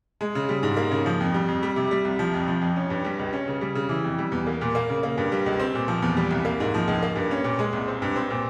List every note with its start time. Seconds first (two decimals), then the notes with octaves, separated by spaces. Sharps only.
0.21 G#3
0.35 C#3
0.49 G3
0.63 G#2
0.77 A#3
0.91 C#3
1.06 F3
1.20 F2
1.34 G3
1.48 F2
1.63 G3
1.76 C3
1.91 G3
2.05 C2
2.19 F3
2.33 F2
2.48 F3
2.61 F2
2.76 C#4
2.90 G2
3.05 G3
3.19 C#2
3.33 C#4
3.48 C#3
3.61 G3
3.75 C#3
3.89 E3
4.04 F2
4.18 G3
4.32 E2
4.47 A#3
4.61 A#2
4.75 A#3
4.90 C#3
5.03 A#3
5.18 G2
5.32 G3
5.46 C#2
5.59 C4
5.75 A#2
5.88 F3
6.02 E2
6.17 G3
6.31 C2
6.45 A#3
6.60 G#2
6.74 F3
6.88 C#2
7.03 A#3
7.16 G2
7.31 C#4
7.44 A#2
7.59 G#3
7.73 C2
7.88 C4
8.02 G2
8.16 C4
8.30 A#2